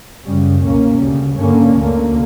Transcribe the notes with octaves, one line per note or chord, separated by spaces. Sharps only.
F#2 C#3 G3 C#4
C#2 B2 A#3 C#4
D2 C#3 G3
G2 D3 A#3 C#4
D2 D3 A#3